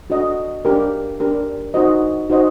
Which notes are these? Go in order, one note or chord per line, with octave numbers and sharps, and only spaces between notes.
D4 F#4 A4 D#5
D4 G4 A#4
D4 G4 A#4
D#4 F#4 C5 D#5
D#4 F#4 C5 D#5